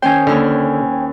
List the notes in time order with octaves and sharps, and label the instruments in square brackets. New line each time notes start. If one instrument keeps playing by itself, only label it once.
[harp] D#3 C#4 C5 [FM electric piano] G5 G#5
[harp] D#2 E4 F6 [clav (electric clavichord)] D3